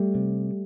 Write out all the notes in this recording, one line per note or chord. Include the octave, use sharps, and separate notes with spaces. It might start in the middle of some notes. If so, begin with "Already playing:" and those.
Already playing: G3 A3
C3